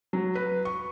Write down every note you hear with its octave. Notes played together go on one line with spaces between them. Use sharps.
F#3
B4
C#6